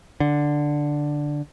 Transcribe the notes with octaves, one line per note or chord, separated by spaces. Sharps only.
D3